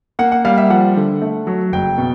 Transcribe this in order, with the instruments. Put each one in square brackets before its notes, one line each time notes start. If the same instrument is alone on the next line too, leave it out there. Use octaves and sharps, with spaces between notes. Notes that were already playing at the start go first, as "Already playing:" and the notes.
[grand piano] A#3 F#5
F#5
G3 F5
E5
F3 F#5
D3
A3
F#3
F#1 G5
B2